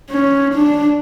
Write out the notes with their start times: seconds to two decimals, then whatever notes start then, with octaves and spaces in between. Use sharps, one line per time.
0.11 C#4
0.54 D4